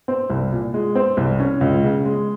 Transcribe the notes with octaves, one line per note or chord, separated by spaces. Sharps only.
C4
C2
A#2
G#3
C4
C2
C#4
C#2
C#3
G#3